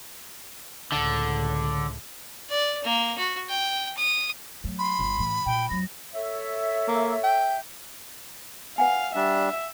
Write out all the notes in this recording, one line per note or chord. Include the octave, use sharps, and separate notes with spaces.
C#2 A2 D3
D5
A#3
F#4
G5
D#6
F#3 A3
B5 C6
G1 G3
A2 E3
A#2 G5
F2 F#3 A#6
A4 C#5 E5
A#3
G5
B4 F5 F#5 G#5
G3 D4 E5